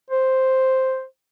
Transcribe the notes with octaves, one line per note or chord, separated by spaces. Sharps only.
C5